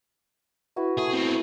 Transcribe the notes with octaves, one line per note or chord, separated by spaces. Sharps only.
E4 F#4 B4
A3 G#4
B3 C4